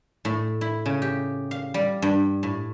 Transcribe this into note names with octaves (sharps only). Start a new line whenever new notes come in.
A2
E4
C#3
G4
F5
G3
G2
A2